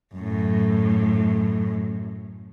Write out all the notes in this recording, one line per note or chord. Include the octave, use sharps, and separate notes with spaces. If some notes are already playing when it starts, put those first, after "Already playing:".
F#2 A2